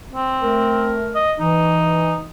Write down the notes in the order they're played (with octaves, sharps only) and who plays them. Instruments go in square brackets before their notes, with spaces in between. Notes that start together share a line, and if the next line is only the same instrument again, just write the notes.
[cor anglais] C4
[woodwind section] A3 A#4
[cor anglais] D#5
[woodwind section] E3 [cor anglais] D#4